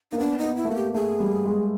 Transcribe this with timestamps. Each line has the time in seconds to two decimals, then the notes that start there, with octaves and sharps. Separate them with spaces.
0.11 A#3 D#4
0.18 B3 D4
0.38 D#4
0.43 B3
0.56 E4
0.65 A3
0.69 A#3 F#4
0.75 G4
0.94 A3 G#4
1.20 G3
1.45 G#3